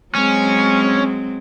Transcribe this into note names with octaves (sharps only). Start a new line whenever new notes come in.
F#3 G#3 C4 C#4